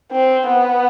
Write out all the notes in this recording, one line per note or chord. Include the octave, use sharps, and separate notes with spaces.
C4
B3